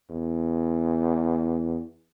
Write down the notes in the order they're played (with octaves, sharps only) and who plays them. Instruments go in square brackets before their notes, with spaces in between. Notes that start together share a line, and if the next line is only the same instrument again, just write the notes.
[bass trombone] E2